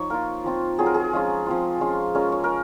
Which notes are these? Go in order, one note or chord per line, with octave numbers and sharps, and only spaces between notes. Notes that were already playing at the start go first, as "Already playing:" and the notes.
Already playing: F3 D#4 C#5
A#3 F4 A#4
F3 C4 F4
F#3 C4 F4 G#4
A#4
G#4
F3 G#3 C#4 F4
F3 C4 F4
G#3 C#4 F4
G#3 C#4 F4 A#4
C#5
A#4